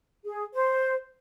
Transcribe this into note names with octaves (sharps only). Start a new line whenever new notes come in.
G#4
C5